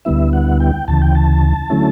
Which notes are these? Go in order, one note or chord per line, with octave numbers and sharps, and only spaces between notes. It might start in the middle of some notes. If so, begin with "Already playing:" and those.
D2 D3 G3 B3 E4 E5
F#5
G5
D2 C#3 E3 A5
G5
A5
D3 F#3 A3 C#4 E4